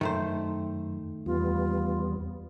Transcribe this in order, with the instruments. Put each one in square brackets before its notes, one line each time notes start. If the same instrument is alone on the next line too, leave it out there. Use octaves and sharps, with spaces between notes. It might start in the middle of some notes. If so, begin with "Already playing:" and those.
[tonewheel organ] F#2 [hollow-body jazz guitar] D#3 A3 C5
[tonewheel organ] E2 G3 B3 [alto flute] F4